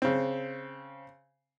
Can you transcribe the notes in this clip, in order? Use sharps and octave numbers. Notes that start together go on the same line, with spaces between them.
C#3 C4